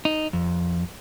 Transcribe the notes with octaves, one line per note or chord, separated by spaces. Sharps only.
D#4
F2